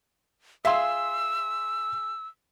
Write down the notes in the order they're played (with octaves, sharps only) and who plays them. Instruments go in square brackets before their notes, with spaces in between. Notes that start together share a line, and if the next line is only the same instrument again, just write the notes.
[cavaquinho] F4 G#4 G#5 [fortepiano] E5 C6 [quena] E6